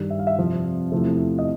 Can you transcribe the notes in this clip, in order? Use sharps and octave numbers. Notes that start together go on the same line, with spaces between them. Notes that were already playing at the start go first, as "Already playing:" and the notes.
Already playing: G2 D#3 G3
E5
F5
E5
F2 C3 F3
E2 C3 F3 A3
D#5